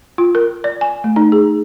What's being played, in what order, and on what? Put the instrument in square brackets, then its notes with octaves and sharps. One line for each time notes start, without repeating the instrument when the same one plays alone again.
[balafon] F4
A#4
D5
G#5
A3
D#4
G#4